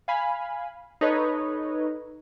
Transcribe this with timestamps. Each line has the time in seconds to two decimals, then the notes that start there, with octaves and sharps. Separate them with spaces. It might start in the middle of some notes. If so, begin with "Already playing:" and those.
0.08 F5 G#5 B5
1.01 D#4 A4 B4 C#5 D#5